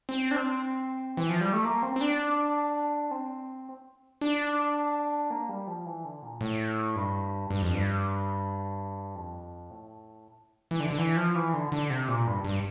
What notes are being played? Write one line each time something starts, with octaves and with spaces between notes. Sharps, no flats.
C4
D4
C4
E3
F3
G3
A3
A#3
C4
C4
D4
C4
D4
A#3
G3
F3
E3
D3
A#2
A2
G2
G2
F2
G2
F2
A2
E3
D3
D3
E3
F3
E3
D3
D3
C3
A#2
G2
G2